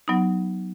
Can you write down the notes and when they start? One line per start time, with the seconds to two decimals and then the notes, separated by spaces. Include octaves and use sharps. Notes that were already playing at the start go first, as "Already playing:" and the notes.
0.08 F#3 B3 D#4